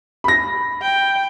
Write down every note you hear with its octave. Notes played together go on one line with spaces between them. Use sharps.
B5 A#6
G5